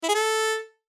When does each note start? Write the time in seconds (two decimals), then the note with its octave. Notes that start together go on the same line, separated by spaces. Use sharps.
0.03 E4
0.09 G#4
0.14 A4